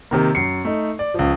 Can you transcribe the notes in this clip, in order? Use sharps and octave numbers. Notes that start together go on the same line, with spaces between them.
C3 D#3 A#3
F#2 C7 C#7
A3 D#4
D5
C#2 F3